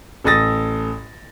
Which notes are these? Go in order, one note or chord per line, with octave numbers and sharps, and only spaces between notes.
A1 A4 D#6 A6 A#6